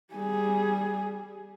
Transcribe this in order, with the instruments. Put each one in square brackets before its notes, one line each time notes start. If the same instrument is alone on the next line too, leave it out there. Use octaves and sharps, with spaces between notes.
[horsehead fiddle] G3 G#4